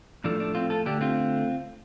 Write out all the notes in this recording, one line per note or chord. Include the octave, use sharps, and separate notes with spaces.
A2 F3 A3 D4
D4
C4 F4
F4 A4
D3 A3 D4 G4
C4 F4